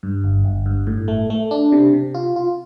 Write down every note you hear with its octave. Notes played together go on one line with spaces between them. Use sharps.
G2
G1
G1
G2
A2
A3
A3
D4
C3
C3
F4
F4